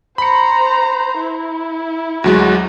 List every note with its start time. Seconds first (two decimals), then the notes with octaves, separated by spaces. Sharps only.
0.18 C5 A#5 B5 C#7
1.19 E4
2.24 D2 F#3 G#3 F#4